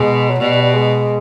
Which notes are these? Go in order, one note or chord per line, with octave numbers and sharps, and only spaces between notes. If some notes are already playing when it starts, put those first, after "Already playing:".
Already playing: B2 G#3
F#3
B2 G3
G3
G3
G#3